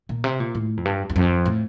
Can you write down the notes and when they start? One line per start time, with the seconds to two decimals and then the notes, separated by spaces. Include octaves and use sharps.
0.09 A#2
0.24 C3
0.40 A#2
0.55 A2
0.77 F2
0.85 G2
1.10 E2
1.16 F2
1.46 A2